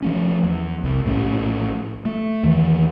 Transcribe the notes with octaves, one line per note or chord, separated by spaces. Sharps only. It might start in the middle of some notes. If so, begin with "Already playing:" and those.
F3 A3 C#4
E2
C2
A#1 A2 C#4
A3
E2 D#3 E3